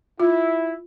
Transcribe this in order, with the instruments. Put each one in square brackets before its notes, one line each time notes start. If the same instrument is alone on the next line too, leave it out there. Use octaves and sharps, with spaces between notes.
[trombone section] E4 [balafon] F4